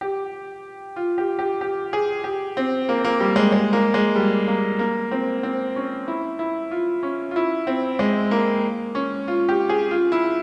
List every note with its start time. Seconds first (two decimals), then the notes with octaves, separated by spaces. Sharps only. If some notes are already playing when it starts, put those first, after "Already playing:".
0.01 G4
0.96 F4
1.18 G4
1.39 G4
1.61 G4
1.93 G#4
2.24 G4
2.57 C4
2.89 A#3
3.04 A#3
3.20 G3
3.36 G#3
3.52 G#3
3.73 A#3
3.94 G#3
4.16 G3
4.47 A#3
4.79 A#3
5.11 C4
5.43 C4
5.76 C#4
6.08 E4
6.39 E4
6.71 F4
7.03 C#4
7.31 F4
7.36 E4
7.67 C4
7.99 G#3
8.31 A#3
8.95 C#4
9.28 F4
9.49 G4
9.69 G#4
9.91 F4
10.12 E4